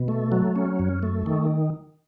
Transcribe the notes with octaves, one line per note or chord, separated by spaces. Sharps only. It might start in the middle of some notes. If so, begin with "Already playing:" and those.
Already playing: B2
A3
F#3
C#4
F#2
A3
D#3